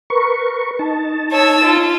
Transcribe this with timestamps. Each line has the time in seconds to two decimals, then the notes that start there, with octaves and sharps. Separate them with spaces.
0.10 A#4 B4 C#6
0.79 D#4 A5
1.32 C#5 E6
1.65 F4